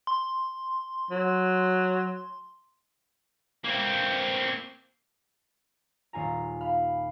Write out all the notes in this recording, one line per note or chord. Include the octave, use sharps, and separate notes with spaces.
C6
F#3
A#3 C4
D#1 F4 G#5 A#5
F5 B5